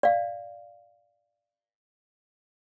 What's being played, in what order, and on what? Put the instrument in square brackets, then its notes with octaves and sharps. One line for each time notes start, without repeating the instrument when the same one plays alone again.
[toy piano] D5 F5